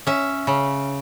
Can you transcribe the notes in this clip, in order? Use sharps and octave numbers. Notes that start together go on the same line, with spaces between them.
C#4 E5
C#3